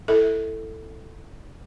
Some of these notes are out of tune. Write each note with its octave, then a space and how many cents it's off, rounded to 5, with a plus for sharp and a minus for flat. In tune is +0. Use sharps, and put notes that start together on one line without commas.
E4 +10 A4 +10 E5 -25